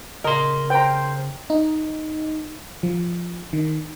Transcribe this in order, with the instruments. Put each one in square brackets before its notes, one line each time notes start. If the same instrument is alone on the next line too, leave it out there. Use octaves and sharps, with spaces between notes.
[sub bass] C#3 [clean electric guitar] A#4 C6 [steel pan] D#5 A#5
[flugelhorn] C5 [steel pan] G5 A#5
[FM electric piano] D#4
F3
D#3